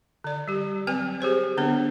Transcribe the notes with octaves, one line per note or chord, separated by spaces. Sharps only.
D3 D5
G3 G4
F#3 C4 B4 G#5
G4 G#4 C5 C#5
D3 B3 D4 B4 C#5